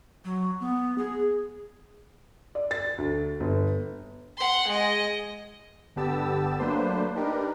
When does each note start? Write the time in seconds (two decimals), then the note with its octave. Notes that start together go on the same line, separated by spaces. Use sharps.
0.25 F#3
0.60 B3
0.98 G#4
2.55 D5
2.71 A6
2.98 D2
3.40 G1
4.37 F#5 C6
4.68 G#3 D#5
5.96 G1 D3 B3 G4 A5 E6
6.59 F#3 A3 A#3 D4 B4 C5
7.15 D4 D#4 G4 A#4 B4